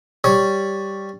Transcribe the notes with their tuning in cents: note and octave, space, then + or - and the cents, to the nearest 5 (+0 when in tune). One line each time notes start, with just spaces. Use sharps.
G3 +0 C#5 +0